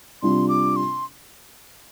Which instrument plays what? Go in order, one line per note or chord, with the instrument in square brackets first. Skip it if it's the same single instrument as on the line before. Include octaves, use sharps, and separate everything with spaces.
[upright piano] C3 G3 D4 F4 [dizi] C6
[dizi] D6
C6